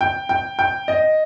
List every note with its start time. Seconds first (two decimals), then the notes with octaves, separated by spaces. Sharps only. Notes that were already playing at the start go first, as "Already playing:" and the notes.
0.01 G5
0.29 G5
0.59 G5
0.88 D#5